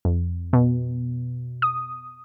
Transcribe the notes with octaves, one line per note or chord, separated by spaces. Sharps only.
F2
B2
D#6